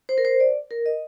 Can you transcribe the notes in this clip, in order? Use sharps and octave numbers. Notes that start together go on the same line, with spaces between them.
C5
A#4
C5
D5
A#4
D#5